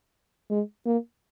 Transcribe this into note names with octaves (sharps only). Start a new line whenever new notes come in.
G#3
A#3